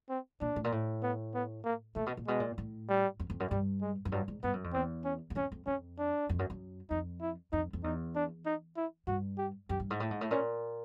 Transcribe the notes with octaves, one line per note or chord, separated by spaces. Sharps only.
C4
A#2 D4
A2
A#2
A2
B3
B3
A#3
A#2 A3
B2
A#2
B2 G#3
A#2
A2
G3
F2
F2
F#2
G2 G3
G#3
F#2
G2 F#3
G#2
G2 B3
F#2
F2
E2 C4
C#4
E2
F2 C#4
F2
F2 C#4
D4
F2
F#2
F#2
F2 D#4
E4
F2 D#4
F2
E2 D#4
D4
D#4
E4
G2 F#4
G4
F#2 G4
G2
G#2
A2
G#2
A2
A#2 C#4